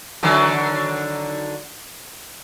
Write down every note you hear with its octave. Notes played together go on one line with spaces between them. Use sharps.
D3 D#3 F#3